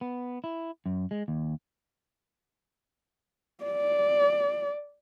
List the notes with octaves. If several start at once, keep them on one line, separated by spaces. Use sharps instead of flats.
B3
E4
F#2
G#3
D#2
D5